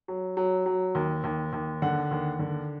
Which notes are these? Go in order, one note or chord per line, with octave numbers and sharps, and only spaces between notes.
F#3
F#3
F#3
D#2
D#2
D#2
D3 F#5
D#2
D3